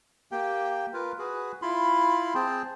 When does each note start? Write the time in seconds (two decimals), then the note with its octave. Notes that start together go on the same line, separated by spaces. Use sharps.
0.32 A#3 G4 G5
0.94 F4 A#4 B4
1.19 F#4 G#4 B4
1.62 E4 F4 B5 C6
2.35 C4 G#4 G5 A5